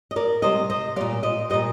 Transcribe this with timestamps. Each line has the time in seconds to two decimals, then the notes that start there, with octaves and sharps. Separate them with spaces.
0.11 D#5
0.16 A#4 D5
0.42 C3 G3 C5 D#5
0.70 C5 D#5
0.96 A#2 G3 D5 F5
1.23 C5 D#5
1.50 A#2 G3 C5 D#5